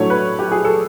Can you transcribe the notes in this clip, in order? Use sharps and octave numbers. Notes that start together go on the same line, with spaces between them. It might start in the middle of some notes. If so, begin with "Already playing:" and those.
Already playing: A2 F#3 A3 D4 C#5
B4
G4
G#4
A4